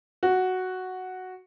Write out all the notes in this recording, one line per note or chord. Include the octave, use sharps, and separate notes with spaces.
F#4